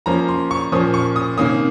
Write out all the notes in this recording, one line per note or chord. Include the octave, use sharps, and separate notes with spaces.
F3 A#3 C#4 A#5
C6
C#6
A#2 F3 A#3 C#4 D#6
C#6
D#6
C3 D#3 A#3 C#4 D#6